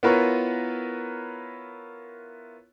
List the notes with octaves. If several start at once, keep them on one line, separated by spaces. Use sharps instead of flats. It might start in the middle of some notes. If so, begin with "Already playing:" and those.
B3 E4 F4 A#4 B4 C#5